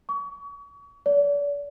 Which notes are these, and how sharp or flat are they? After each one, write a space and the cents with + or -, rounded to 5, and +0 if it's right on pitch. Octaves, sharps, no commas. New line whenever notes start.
C#6 +35
D5 -40